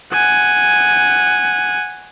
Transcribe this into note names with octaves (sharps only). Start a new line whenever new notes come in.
F#5 G#5